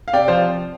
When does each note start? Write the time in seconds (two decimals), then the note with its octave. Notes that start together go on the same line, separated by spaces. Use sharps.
0.08 F5
0.13 C3 D5 G5
0.28 F3 C5 F5